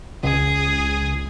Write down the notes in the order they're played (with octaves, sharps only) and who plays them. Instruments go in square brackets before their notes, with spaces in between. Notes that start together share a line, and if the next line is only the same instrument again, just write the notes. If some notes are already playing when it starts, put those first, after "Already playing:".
[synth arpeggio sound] C#2 [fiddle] G#4